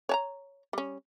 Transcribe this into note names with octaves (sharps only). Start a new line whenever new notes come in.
C#5 A5 A#5
G3 C#4